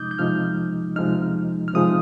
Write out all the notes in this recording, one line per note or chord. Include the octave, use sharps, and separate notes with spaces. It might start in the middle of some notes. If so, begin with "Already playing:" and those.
Already playing: C3 F3 G#3 D#4 D6 D#6 G6
G6
C3 F3 G#3 D#4 F6
C3 F3 G#3 D#4 F6
F6
C3 F3 G#3 D#4 D#6